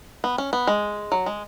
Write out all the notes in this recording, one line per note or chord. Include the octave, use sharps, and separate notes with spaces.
B3
C#4
B3
G#3
F#3
G#3